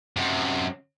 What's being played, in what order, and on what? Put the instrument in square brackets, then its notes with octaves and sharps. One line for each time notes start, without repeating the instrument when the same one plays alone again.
[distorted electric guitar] F#2 C3